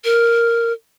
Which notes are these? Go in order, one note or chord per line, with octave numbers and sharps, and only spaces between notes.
A#4